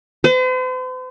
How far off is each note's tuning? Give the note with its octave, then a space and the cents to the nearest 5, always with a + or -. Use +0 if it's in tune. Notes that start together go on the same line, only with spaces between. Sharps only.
C5 -45